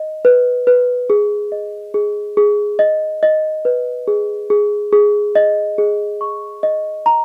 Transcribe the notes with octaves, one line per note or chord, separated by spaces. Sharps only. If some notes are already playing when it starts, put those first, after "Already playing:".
Already playing: D#5
B4
B4
G#4
D#5
G#4
G#4
D#5
D#5
B4
G#4
G#4
G#4
D#5
G#4
C#6
D#5
A#5